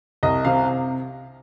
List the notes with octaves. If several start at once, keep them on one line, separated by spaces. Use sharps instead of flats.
C2 D#5
C3 F5